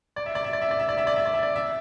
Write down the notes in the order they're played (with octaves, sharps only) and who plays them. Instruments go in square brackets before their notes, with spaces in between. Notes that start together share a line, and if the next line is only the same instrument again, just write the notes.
[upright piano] D5
E5
D5
E5
D5
E5
D5
E5
D5
E5
D5
E5
D5
E5
D5
E5